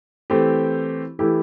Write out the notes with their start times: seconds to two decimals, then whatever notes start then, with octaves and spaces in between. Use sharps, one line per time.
0.30 E3 A3 C4 G4
1.19 E3 A3 E4 G4